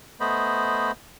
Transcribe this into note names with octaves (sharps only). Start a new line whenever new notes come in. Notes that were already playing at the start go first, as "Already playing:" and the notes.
A3 B3 C5 D#5 B5